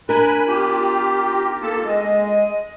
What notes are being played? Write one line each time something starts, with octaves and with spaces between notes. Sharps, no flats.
D4 A#4 G#5 B5 F#6
B3 D#4 F4 G4
A#3 A4 A5
G#3 D#5